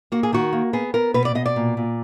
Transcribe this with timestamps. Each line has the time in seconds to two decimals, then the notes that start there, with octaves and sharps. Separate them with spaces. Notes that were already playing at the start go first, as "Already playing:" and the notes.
0.12 A#3 F#4
0.23 G#4
0.33 D#3 F#4
0.53 A#3
0.73 B3 G#4
0.94 B3 A#4
1.14 B2 B4
1.25 D5
1.35 B2 D#5
1.46 D5
1.56 A#2
1.77 A#2